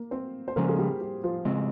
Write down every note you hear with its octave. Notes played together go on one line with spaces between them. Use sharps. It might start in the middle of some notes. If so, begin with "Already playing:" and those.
Already playing: A#3 A#4
C4 C5
C5
C#3 F3 G#3 A#3 C#4 A#4
G#4
G3 G4
G3 G4
F3 F4
C#3 G#3 C4